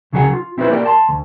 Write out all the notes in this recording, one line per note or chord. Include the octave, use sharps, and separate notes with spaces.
C#2 C#3 F#3 G#4 C5 F#5
F4
C4 E4 F4 G4 B4 C5
A#3 B3 G4 A#4 D5 G5
A5 C6
D2